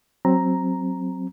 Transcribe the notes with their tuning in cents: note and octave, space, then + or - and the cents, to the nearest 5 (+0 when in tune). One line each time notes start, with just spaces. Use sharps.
F#3 +0 C4 +10 A#5 +0